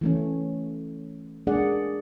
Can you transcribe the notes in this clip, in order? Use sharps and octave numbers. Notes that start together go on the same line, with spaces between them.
E3 A3 C#4
G#3 A#3 D4 G#4 D5 F#5